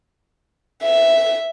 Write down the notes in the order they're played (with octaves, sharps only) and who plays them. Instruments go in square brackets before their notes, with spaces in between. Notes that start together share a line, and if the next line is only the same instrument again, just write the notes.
[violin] E5